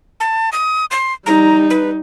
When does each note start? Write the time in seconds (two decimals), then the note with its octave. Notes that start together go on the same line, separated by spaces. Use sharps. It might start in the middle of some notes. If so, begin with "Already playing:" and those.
0.20 A5
0.53 D#6
0.91 C6
1.26 G3 D#4 A#5
1.70 B4